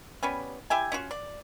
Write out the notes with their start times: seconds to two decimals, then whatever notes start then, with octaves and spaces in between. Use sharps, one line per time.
0.23 G3 B3 C#4
0.70 E4 G4 E5 G#5
0.92 C#4 F4 F#4
1.11 D5